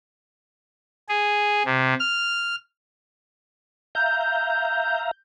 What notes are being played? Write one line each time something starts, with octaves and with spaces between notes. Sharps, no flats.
G#4
C3
F6
E5 F5 A#5 G6